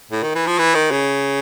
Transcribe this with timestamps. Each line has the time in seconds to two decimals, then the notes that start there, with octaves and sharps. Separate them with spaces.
0.11 A2
0.23 D#3
0.35 E3
0.47 F3
0.59 E3
0.75 D#3
0.91 C#3